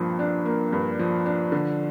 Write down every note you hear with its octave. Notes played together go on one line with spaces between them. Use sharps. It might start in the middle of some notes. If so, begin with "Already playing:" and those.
Already playing: G2 F3 A#3
D4
A#3
G2
F3
D4
D3